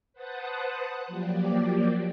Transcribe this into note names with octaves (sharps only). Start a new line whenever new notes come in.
B4 C5 F#5 A5 D#6 F#6
F3 F#3 A#3 G4 D5